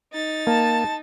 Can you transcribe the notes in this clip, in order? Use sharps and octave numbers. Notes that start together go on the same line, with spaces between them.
D#4 A6
A#3 A5